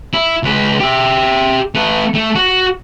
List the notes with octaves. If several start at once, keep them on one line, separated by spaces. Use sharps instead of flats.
E4
C#2 B4
G4 E5
A3 B4
A3
F#4